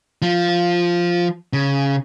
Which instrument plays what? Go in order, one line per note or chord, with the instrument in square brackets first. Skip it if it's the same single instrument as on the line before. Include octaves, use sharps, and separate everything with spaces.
[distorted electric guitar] F3
C#3